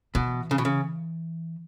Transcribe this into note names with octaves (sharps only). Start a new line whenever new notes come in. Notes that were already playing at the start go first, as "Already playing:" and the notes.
B2 E3
C#3
B2
C#3